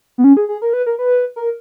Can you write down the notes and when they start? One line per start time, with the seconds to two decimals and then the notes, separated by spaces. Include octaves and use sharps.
0.18 B3
0.24 C#4
0.37 G#4
0.49 G#4
0.62 A#4
0.73 B4
0.86 A#4
0.99 B4
1.36 A#4